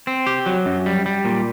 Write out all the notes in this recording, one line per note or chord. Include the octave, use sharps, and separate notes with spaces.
C4
G4
F#3
F#2
G3
G3
A#2